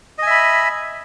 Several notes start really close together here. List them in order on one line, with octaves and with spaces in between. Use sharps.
D#5 G#5 E5 B5